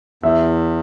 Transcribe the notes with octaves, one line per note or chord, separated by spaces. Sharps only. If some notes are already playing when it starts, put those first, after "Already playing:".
E2 E5